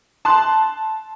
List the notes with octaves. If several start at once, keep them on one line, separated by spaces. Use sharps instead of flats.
A5 C6 F#6